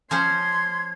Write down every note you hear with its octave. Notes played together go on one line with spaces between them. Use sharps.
F3 C#4 C5 C6 G#6